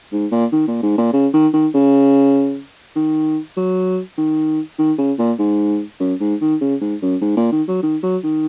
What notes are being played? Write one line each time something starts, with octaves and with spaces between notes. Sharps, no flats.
G#2
A#2
D#3
A#2
G#2
A#2
C#3
D#3
D#3
C#3
D#3
F#3
D#3
D#3
C#3
A#2
G#2
F#2
G#2
D#3
C#3
G#2
F#2
G#2
A#2
D#3
F#3
D#3
F#3
D#3